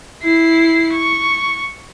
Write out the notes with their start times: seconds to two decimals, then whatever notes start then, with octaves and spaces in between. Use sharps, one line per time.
0.22 E4 C7
0.92 C#6